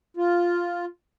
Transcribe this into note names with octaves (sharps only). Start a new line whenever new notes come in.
F4